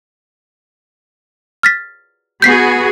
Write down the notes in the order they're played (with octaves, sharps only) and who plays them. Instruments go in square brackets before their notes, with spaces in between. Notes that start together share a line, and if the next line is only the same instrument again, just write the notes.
[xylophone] F6 A6 B6
[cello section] B3 F#4 G#4 [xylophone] G6 B6 C7